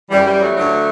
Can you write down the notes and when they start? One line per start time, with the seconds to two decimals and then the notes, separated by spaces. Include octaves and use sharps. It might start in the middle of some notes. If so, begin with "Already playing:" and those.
0.11 F#2 E3 G3
0.25 G3
0.41 F#3 A3
0.56 D2 D3 F#3